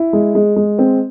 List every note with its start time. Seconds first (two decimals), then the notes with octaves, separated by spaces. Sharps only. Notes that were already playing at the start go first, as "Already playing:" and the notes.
Already playing: E4
0.13 G#3
0.35 G#3
0.56 G#3
0.79 C4